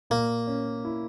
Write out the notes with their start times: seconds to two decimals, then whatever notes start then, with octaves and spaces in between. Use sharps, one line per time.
0.10 A#2 A#3
0.47 C#4
0.85 E4